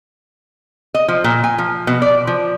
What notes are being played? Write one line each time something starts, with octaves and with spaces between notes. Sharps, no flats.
D#5
F3
A#2
G#5
F3
B2
D5
F3